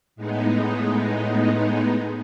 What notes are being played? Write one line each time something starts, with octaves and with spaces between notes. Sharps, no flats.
A2 G#3 B3 D#4